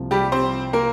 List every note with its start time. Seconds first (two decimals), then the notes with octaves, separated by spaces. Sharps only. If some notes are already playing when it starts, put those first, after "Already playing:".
Already playing: C2 C3 F3 A#3
0.11 G3 G4
0.32 C4 C5
0.73 A#3 A#4